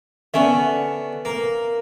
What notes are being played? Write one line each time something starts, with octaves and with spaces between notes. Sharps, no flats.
D3 B3 C#4 E5
A#3